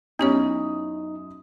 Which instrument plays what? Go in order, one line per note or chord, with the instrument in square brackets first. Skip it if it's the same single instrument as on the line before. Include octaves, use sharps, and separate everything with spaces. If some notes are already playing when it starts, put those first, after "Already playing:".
[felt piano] F#2 D#6 [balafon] B3 G4 C#5 [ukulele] C#4 E4 [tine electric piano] D#4